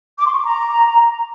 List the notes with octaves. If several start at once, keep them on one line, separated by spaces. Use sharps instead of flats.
D6
C6
C#6
D6
A#5